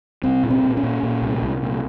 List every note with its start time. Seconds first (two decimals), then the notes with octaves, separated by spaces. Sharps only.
0.23 C2 C4
0.43 A#2
0.50 C4
0.63 A#2
0.77 C#4
0.83 A#2
1.03 A#2
1.22 C2
1.42 C2
1.62 A#2